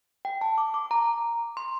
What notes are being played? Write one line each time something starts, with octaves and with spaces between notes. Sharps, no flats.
G5
A5
D6
D6
A#5
C6